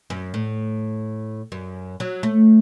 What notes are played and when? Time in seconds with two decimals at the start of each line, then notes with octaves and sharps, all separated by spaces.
0.10 F#2
0.34 A2
1.52 F#2
2.00 F#3
2.23 A3